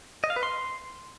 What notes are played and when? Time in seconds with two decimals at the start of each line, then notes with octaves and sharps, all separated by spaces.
0.24 D#5
0.30 F5
0.36 B4
0.43 C6